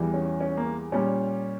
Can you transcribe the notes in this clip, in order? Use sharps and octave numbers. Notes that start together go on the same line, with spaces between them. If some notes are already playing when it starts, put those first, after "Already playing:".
Already playing: E2 E3 G3
C#4
C#4
A#3
A#2 G3 C#4